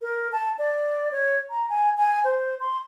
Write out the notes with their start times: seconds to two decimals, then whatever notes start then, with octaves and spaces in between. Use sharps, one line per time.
0.02 A#4
0.32 A5
0.58 D5
1.12 C#5
1.50 A#5
1.70 G#5
1.98 G#5
2.24 C5
2.60 C6